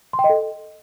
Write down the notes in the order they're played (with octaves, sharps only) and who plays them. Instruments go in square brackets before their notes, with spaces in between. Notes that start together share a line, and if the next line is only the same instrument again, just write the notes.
[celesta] C6
G5
D#5
A4